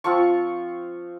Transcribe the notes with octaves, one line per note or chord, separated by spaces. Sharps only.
F3 C4 F4 C#6